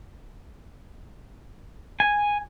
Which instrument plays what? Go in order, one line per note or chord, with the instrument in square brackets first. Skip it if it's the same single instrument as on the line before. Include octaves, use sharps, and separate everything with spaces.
[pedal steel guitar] G#5